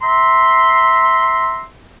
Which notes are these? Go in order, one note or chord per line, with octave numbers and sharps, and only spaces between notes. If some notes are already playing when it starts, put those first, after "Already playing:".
E5 A#5 C6